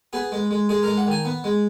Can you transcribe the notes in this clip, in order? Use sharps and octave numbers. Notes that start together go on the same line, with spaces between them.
B3 G#4
G#3
G#3
G#3 G#4
G#3 A#4
F#5
D#3 G#5
B3
G#3